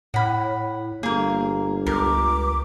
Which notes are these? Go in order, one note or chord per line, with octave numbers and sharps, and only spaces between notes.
A2 F#5 B5
G1 A#3 G#4 A#4
C#2 A#4 D6